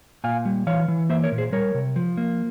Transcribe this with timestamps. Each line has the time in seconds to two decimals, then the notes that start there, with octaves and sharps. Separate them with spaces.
0.24 A#2 F5 G#5
0.45 G3
0.67 E3 C#5 F5
0.88 E3
1.09 A#3 C5 E5
1.24 A#4 C#5
1.32 A#2
1.38 G#4 C5
1.52 G3 A#4 C#5
1.74 C3
1.96 F3
2.17 A#3